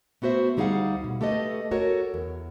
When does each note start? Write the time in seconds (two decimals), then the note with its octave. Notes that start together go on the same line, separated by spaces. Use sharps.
0.22 A3 B3 F#4 C5 E5
0.57 D2 G3 D#4 G#4 F5 F#5
1.04 B2
1.21 A3 G4 A4 B4 D#5
1.71 F#4 A4 A#4 C#5
2.14 E2